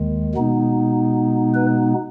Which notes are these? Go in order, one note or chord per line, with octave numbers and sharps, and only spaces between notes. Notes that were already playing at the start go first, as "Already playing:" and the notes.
Already playing: D#2 D#3 G#3
B2 G#3 B3 D#4
B4